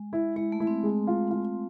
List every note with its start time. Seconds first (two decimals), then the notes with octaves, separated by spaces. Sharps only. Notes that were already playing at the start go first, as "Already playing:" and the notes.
Already playing: G#3
0.13 E4
0.36 G#3 E4
0.52 A3
0.60 E4
0.67 C4
0.83 G#3
1.07 F4
1.31 F4